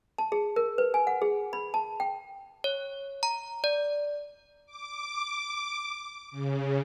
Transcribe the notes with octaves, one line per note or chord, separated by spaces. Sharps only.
A5
G#4
A#4
B4
G#5
F#5
G#4
B5
A5
G5
C#5
A#5
D5
D6
C#3